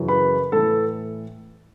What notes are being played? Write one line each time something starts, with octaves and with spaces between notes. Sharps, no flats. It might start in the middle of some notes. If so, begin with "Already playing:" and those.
Already playing: F#2 C#3 E3
B4 B5
A2 E3 A4 A5